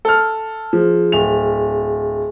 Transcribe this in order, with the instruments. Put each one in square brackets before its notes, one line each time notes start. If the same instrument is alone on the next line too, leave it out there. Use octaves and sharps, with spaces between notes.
[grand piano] A4 F6
[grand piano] F3 [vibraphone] G#4
[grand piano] D1 F7